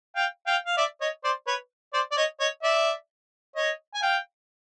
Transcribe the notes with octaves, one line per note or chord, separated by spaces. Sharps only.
F5 G5
F5 G5
F5
D5 E5
C#5 D#5
C5 D5
B4 C#5
C5 D5
D5
C#5 D#5
C#5 D#5
D5 E5
C#5 D#5
G#5
F5 G5